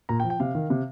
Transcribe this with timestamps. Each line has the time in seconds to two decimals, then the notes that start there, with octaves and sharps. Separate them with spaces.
0.09 A#2 A#5
0.20 G5
0.24 F3
0.30 G5
0.40 C3 F5
0.55 D#3
0.70 C3